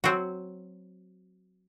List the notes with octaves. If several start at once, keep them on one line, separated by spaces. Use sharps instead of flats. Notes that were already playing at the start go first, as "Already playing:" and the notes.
F#3 C4 F#4